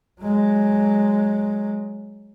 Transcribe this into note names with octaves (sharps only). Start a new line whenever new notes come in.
F#3 G#3